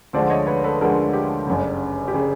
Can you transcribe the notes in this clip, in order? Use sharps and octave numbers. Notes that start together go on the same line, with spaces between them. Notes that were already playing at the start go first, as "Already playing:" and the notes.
D2 D3 F3 G#3 C5 D5
C#5 D#5
B4 C#5
A4 B4
D2 D3 F3 G#3 G#4 A#4
G4
G1 F#2 C#3
G4
C#3 G#4